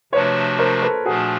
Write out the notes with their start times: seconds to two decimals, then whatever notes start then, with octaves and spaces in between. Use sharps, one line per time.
0.12 C3 F3 A3 D4 F#4 B4 C#5
0.58 A#4 C5
0.82 A4 B4
1.05 A#2 F3 A3 D4 F#4 G#4